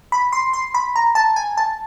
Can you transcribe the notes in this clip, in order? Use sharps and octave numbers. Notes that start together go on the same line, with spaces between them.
B5
C6
C6
B5
A#5
A5
G#5
A5